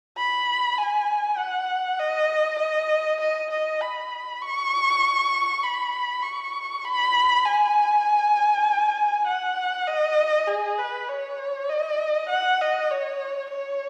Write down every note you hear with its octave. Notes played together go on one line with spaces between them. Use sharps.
B5
G#5
F#5
D#5
D#5
D#5
D#5
B5
C#6
B5
C#6
B5
G#5
F#5
D#5
G#4
B4
C#5
D#5
F#5
D#5
C#5
C#5